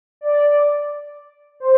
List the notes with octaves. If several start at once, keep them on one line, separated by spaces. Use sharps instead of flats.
D5
C5